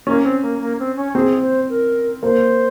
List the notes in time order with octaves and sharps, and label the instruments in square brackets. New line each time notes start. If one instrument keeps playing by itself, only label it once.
[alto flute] A#3 [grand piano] C#4
[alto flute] C4
A#3
A#3
C4
C#4
[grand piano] C4 [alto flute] G#4
[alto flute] C5
A#4
[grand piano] A#3 [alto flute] C5